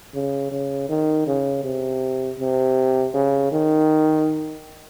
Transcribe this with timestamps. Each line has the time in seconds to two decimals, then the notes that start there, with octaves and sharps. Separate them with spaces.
0.14 C#3
0.51 C#3
0.89 D#3
1.27 C#3
1.64 C3
2.39 C3
3.14 C#3
3.52 D#3